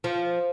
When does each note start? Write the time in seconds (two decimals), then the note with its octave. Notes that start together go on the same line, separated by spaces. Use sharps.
0.04 F3